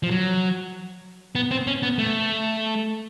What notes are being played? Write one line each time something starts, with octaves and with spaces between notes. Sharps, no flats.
F3
F#3
B3
C4
C#4
B3
A3